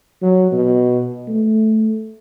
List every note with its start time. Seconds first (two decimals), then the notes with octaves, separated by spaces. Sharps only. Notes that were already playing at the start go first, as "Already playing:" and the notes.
0.22 F#3
0.52 B2
1.28 A3